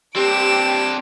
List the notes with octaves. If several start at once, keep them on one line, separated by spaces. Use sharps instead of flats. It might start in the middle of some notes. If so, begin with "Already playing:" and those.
C4 D4 G4 D7 E7